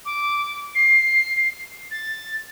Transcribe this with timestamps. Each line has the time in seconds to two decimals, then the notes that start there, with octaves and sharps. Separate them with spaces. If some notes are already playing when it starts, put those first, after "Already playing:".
0.05 D6
0.75 C7
1.91 A6